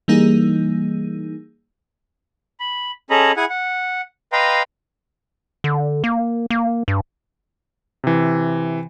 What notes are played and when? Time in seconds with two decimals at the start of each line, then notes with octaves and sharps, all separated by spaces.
0.08 E3 G3 A#3 D#4 G#4
2.60 B5
3.10 C#4 G#4 A4 D#5 A#5 B5
3.37 E4 G#4 F#5 G#5
3.50 F#5
4.33 B4 D#5 F5 G5 A#5 C6
5.64 D3
6.04 A#3
6.50 A#3
6.88 G2
8.04 C3 E3